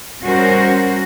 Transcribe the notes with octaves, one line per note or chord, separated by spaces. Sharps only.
G3 C#4 F#4 A#4 C5